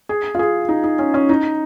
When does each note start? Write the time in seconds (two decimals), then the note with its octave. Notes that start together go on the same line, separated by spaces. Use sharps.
0.09 G#4
0.35 F4
0.39 G#4
0.69 D#4
0.84 D#4
0.99 C#4
1.14 C#4
1.29 D#4